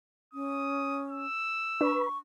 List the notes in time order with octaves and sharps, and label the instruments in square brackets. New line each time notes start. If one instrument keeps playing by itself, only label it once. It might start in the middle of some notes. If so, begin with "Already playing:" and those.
[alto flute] C#4 [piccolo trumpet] D#6
[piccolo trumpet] E6
[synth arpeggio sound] D4 [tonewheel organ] B4 [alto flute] C#6